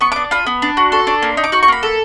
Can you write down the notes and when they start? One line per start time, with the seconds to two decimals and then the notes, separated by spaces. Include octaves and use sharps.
0.01 B3 C#6
0.12 D4 D6
0.31 F4 B5
0.47 B3
0.62 D4
0.77 F#4
0.92 A4 C6
1.07 D4
1.22 A#3
1.37 D#4
1.44 D6
1.52 F#4 C#6
1.63 C#6
1.68 A#3 B5
1.83 A4